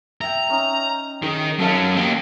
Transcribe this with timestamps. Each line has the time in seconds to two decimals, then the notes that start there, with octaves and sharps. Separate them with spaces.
0.21 E5 G5 A#5
0.50 C#4 D#4
1.23 D#3 D#4 G#4
1.59 F#3 C#4 A4 F5 A5
1.96 A#3 G4